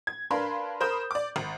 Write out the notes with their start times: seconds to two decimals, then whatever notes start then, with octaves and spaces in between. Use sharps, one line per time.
0.07 G#6
0.31 D4 A#4 B4 F5 B5 C6
0.80 A#4 C5 B5 D#6 G6
1.11 D5 D6
1.36 G#1